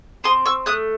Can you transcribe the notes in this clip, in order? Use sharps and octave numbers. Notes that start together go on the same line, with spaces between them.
C4 C6 D#6
C#6 E6
A3 D#6 F#6